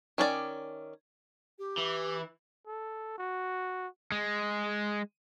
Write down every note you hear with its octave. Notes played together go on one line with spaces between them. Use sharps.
D#3 C#4 D4 D5
G4
E3
A4
F#4
G#3